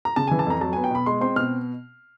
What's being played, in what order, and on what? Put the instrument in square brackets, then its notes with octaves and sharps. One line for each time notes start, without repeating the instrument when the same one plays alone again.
[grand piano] A#5
C#3 A5
E3 G#5
A5
F2 A#5
F#3 A5
B3 G#5
G5
B2 B5
G#3 C6
C4 C6
B2 F6